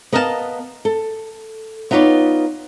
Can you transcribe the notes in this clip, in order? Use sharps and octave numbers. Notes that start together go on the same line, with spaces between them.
B3 A#4 D#5 F5 F#5 A5
A4
B3 D#4 F4 B4 C#5 D5